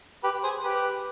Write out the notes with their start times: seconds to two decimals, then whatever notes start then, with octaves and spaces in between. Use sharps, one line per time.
0.24 G4 B4
0.43 G#4 C5
0.63 G4 B4